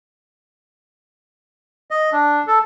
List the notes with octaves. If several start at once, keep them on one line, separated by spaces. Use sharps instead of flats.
D#5
D4
A4